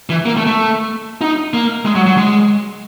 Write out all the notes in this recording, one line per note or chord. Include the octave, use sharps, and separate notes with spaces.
E3
A#3
A3
A3
D#4
A#3
G#3
F#3
F#3
G#3